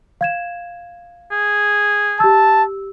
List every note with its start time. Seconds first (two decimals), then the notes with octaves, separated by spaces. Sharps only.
0.21 F5 G#6 E7
1.32 G#4
2.20 G4 A5 E6